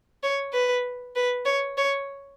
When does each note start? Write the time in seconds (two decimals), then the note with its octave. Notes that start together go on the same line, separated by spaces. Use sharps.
0.23 C#5
0.53 B4
1.16 B4
1.46 C#5
1.78 C#5